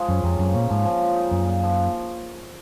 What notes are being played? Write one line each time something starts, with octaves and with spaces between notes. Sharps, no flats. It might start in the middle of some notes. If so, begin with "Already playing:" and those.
Already playing: F3 G#3
F#2 C#4
F2 C3
F#2 A#3
A#2 C#4
G#2 F3
F3
G#3
D#4
F#2 A#2
A#2
F3